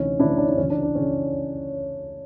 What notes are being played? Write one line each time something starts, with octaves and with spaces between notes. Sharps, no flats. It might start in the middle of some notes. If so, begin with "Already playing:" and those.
Already playing: D2 C3 E3 C#4 D#4
D2 C3 E3 D4 E4
C#4
D4
D4
C#2 C#3 E3 C#4
D4
D4
C#3 E3 C#4